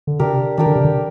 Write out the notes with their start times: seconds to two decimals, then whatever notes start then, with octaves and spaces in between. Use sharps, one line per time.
0.07 D3
0.19 C3 D4 G4 A#4
0.57 D#3 D4 G4 A#4
0.66 D3
0.76 C3
0.84 D3